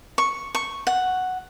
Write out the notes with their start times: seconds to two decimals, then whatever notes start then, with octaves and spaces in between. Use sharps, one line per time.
0.18 C#6
0.55 C#6
0.87 F#5